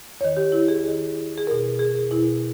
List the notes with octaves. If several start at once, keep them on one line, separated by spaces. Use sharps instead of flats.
E2 D#3 C#5
G4
E4
G#4
E2 D#3
G#4
E2 B2 A#4
G#4
E2 B2 E4